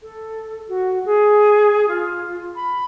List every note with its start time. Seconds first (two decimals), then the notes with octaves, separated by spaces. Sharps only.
0.02 A4
0.69 F#4
1.05 G#4
1.88 F4
2.56 B5